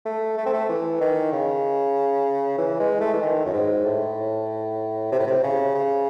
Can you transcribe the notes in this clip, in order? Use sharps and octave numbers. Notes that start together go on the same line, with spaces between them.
A3
A3
C4
A3
E3
D#3
C#3
E3
G#3
A3
E3
D#3
F#2
G#2
A2
C3
A2
C3
C#3
C#3